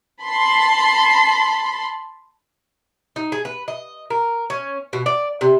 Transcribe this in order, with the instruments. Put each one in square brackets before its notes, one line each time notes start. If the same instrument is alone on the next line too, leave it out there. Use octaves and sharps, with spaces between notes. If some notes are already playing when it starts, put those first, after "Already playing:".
[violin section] A5 B5 C6
[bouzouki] D#4
G#4
B4
D#5
A#4
C#4
B2
D5
C3